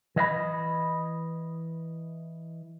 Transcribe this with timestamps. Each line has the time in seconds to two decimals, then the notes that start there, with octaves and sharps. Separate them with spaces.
0.16 E3 D#5 F5 B5